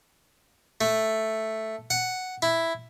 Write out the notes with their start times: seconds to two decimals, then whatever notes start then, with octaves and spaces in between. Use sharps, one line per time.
0.81 A3
1.90 F#5
2.42 E4